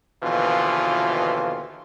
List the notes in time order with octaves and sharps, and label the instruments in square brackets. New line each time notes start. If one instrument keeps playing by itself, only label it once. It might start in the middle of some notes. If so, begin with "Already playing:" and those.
[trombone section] D#2 B2 D3 E3 F3 F4